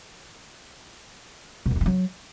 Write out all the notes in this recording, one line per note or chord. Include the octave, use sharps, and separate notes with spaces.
B2
F2
G2
E3
F#3